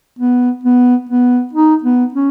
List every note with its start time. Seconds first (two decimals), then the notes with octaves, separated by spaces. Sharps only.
0.19 B3
0.64 B3
1.09 B3
1.53 D#4
1.84 B3
2.14 C#4